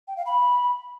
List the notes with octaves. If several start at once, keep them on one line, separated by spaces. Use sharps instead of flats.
G5
F5
B5